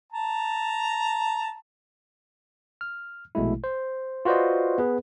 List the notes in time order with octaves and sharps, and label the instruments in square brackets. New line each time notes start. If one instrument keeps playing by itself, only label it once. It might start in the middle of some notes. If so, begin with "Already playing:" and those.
[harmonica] A5 A#5
[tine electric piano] F6
A#1 B2 G#3 A3 E4
C5
F4 F#4 B4 C5 D5 D#5
B3 G#4 B4